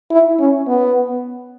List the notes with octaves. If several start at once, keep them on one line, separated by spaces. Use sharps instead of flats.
E4
C#4
B3